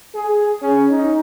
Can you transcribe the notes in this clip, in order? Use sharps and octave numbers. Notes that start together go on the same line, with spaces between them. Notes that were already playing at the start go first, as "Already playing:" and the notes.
G#4
C#4
D#4